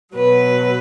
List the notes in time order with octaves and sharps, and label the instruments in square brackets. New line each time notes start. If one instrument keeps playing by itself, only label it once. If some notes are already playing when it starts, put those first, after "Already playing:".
[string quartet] B2 F#3 B4